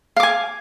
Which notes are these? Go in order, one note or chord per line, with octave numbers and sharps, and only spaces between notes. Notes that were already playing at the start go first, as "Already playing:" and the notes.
F5 G#5 D6